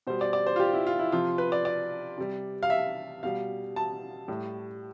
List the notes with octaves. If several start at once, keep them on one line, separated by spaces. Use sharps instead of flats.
B2 G3 C5
D5
D5
C5
F4
G4
E4
F4
E4
C3 F3 F4
B4
D5
D5
C3 G3
F5
E5
B2 G3 F5
A5
A2 G3